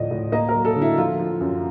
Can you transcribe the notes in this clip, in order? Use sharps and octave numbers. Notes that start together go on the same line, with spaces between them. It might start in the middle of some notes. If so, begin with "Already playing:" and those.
Already playing: D2 A2 F3 D5 D#5
A2
A#3 D#5
A#4
F#3
A4
D3
E4
F3 F4
F3
F#2